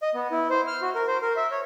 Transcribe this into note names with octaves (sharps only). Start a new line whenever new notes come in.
D#5
B3
E4
C5
F6
F#4
A#4
C5
A#4
E5
C#5